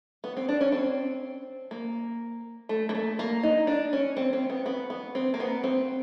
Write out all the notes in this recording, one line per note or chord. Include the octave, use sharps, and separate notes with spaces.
B3
C4
D4
C#4
C4
A#3
A3
A#3
A3
A#3
D#4
D4
C#4
C4
C4
B3
B3
B3
C4
A#3
B3
C4